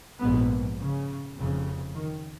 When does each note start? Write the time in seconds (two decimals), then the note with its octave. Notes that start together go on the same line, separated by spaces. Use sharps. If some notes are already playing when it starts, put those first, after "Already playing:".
0.20 A#1 G#2 B3
0.78 C#3
1.36 F1 F2 C#3
1.94 D#3